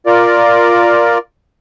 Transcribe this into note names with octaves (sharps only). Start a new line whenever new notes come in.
F4 A#4 D5